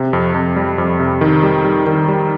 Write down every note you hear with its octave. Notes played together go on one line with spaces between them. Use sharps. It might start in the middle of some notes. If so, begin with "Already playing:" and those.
Already playing: C3
F2
F2
G3
F2
C3
D#3
G3
G3
D#3
G3